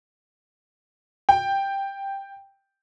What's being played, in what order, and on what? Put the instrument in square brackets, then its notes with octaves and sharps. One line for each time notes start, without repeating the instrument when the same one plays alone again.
[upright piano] G5